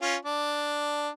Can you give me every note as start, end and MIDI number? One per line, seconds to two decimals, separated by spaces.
0.02 0.16 61
0.02 0.16 65
0.25 1.09 62